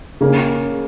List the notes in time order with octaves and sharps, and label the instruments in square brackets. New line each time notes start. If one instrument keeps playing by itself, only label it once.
[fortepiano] C#3 [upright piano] A#3 C#4